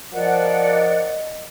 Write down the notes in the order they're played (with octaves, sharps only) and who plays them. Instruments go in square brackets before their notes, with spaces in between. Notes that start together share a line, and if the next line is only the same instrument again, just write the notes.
[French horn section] F3 A#4 [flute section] D5 F#5 [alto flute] D#5